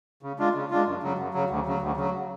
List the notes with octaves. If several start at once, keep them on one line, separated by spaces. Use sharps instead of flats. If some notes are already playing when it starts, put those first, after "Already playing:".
C#3
G#3 D4 F4
C#3
G#3 D4 F4
F#2
C#3 F#3
F#2
C#3 F#3
D2
C#3 F#3
D2
C#3 F#3